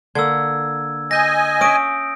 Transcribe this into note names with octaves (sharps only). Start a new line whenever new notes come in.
D3 A#3 E6 G#6
D#5 G#5 G6 A#6
C#4 E5 D#6 D7